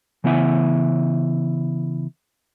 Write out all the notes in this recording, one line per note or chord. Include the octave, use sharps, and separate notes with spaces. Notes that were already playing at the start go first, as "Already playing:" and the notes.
C#3 E3 B3 E4 E5 G#5